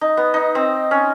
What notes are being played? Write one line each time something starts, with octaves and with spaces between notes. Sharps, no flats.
D#4
B3
D#4
C4
C#4